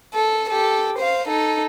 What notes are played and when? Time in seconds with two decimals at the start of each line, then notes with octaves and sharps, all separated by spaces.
0.14 A4
0.50 G4 A4
0.98 C5 F5
1.28 D#4 A4